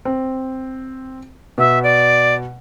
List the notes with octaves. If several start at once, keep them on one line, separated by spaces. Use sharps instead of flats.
C4
B2 E5
D5